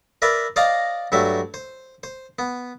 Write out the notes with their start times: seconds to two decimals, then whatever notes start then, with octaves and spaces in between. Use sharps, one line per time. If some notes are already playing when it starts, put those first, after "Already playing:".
0.22 A#4 B4 D5 E5
0.56 C5 D5 D#5 F5 A#5
1.12 G2 F#3 A3 E5
1.54 C5
2.03 C5
2.39 B3